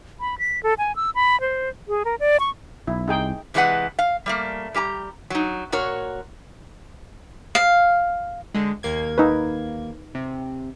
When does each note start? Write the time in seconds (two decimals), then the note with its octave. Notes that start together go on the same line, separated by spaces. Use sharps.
0.20 B5
0.39 B6
0.63 A4
0.78 G#5
0.96 E6
1.15 B5
1.41 C5
1.88 G#4
2.05 A#4
2.20 D5
2.40 C#6
2.87 B1 E4
3.08 C2 D#4 G#4 G5
3.54 C3 E3 G#3 C4 B4 F#5
3.99 F5
4.26 G3 A3 A#3
4.74 G3 G4 G#5 A#5
5.30 F#3 D#4
5.72 A#2 F#4 A#4 C#5
7.55 F5
8.54 D3 G#3
8.83 D#2 A#3 G#6
9.18 D#4 B4
10.15 C3